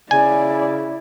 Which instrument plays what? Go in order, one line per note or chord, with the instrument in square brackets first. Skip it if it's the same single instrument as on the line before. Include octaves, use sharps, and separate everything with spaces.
[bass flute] C#3 [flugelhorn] E4 [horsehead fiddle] D5 [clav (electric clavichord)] G#5